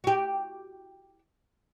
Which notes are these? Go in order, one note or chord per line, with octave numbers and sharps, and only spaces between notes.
F#4 G4